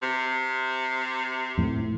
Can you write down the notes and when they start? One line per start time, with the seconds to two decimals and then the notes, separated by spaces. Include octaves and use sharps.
0.02 C3
1.58 F2 A2